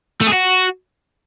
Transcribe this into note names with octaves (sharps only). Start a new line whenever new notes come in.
A3
G#4
F#4